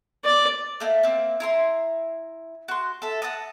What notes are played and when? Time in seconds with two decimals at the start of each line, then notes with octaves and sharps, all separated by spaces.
0.25 D5
0.80 A3 A#3 D#5
1.03 A#3 C4
1.40 E4 A#5 C6
2.68 F#4 C6
3.02 A4 E5
3.22 F#5 A5 A#5 D#6